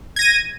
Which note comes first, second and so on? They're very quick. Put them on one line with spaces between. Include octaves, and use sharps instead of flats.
G#6 A#6 D#7